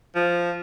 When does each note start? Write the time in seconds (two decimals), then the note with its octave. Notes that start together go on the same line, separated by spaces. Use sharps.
0.16 F3